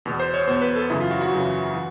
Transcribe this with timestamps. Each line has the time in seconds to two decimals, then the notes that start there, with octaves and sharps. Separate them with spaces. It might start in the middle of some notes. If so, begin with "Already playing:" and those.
0.05 E2 B2
0.20 C5
0.34 C#5
0.47 E2 B2 C5
0.62 B4
0.76 A4
0.90 F#2 C#3 E3 E4
1.00 F4
1.11 F#4
1.21 F#4
1.32 F#2 C#3 E3
1.74 E3